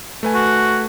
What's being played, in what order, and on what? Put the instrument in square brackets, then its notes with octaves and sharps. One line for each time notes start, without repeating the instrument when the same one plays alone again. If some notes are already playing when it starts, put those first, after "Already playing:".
[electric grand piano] A3 B4 G#5
[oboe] F#4